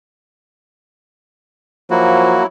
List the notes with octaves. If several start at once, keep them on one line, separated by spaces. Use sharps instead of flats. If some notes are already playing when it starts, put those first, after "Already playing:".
F3 F#3 A#3 E4 F#4